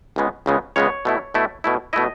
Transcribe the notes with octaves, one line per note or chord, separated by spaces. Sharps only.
C#2 C#3 G#3 B3
C#2 C#3 G#3 B3
C#2 C#3 G#3 B3 C#5
B2 A3 E4
B2 A3 E4
B2 A3 E4
B2 A3 E4 D#5